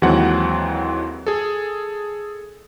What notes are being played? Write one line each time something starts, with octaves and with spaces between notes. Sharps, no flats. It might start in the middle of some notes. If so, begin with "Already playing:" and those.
D#2 E3 F#3 G#3 C4 F#5
G#4 A4